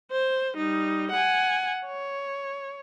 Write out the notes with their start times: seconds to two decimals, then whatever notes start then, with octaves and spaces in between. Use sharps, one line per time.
0.12 C5
0.57 G3 D#4
1.12 F#5 G#5
1.86 C#5